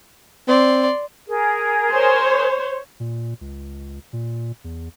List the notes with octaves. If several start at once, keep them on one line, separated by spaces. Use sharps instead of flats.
C4 D5 C6
G#4 A#4
C5 C#5
A#2
C#2
A#2
E2